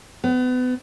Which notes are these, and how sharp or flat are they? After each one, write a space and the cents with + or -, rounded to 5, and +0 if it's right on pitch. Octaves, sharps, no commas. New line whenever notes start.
B3 +30